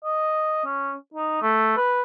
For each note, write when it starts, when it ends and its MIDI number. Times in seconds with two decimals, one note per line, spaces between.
0.04 0.60 75
0.64 0.94 61
1.14 1.38 63
1.42 1.75 57
1.77 2.02 71